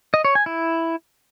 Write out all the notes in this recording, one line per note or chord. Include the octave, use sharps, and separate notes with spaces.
D#5
C#5
G#5
E4